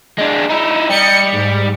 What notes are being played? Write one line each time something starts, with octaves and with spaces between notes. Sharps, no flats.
G#3 D4
D#4 E4
G3 D#5 C#7
G#2